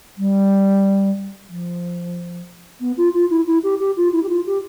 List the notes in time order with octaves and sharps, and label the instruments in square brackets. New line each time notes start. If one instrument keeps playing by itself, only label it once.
[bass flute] G3
F3
B3
F4
F4
E4
E4
G4
G4
F4
E4
G4
F4
G4